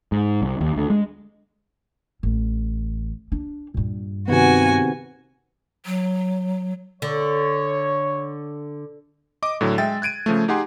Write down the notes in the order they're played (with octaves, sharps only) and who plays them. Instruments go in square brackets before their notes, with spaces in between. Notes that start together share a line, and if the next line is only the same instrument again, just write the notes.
[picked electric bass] G#2
C2
D#2
D2
G#3
[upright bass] A1
D4
G2 A#2
[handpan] C3 D#3 B3 [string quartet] F#4 G#5
[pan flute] F#3
[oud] D3 [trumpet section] C#5
[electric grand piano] D#5 D6
A2 D3 F#3
G#3 E5 G5 A6
F#6 G#6 D7 D#7
C#3 F3 A3
D#4 G4 G#4 F#5 G#5 C6